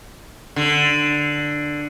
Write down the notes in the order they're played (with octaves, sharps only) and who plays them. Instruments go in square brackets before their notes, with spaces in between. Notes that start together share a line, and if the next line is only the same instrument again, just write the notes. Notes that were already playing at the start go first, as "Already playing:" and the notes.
[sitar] D3